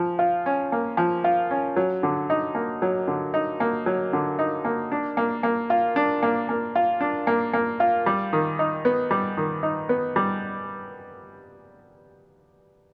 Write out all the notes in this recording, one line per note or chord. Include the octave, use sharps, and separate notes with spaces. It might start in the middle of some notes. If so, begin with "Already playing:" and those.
Already playing: F3
F4
C#4
A#3
F3
F4
C#4
F#3
D3
D#4
A#3
F#3
D3
D#4
A#3
F#3
D3
D#4
A#3
D4
A#3
A#3
F4
D4
A#3
A#3
F4
D4
A#3
A#3
F4
G3
D#3
D#4
B3
G3
D#3
D#4
B3
G3